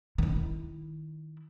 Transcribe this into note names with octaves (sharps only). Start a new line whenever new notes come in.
D#3 E4